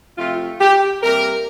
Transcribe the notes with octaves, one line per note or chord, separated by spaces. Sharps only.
C3 F3 A3 F4
G4
C3 G3 A#3 A#4